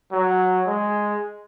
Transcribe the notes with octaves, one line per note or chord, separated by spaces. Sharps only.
F#3
G#3